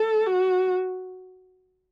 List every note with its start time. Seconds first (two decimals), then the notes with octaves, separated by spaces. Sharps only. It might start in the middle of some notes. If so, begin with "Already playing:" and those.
Already playing: A4
0.26 F#4